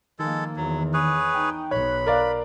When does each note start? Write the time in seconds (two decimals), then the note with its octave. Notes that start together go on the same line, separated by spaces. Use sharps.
0.19 D#3 F3 G#3 A#3 A4
0.56 E2 F#3
0.93 G#4 B4 C#5
1.34 D#4 G5
1.71 B1 C#5 B5 F#6
2.07 A#4 D5 F5